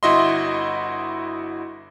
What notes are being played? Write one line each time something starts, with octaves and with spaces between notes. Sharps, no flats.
G1 E4 F#4 D#5 E5 C6